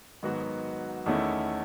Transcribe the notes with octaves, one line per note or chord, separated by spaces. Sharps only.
G#2 D#3 F#3 B3 F#4
E2 D#3 A3 C#4 E4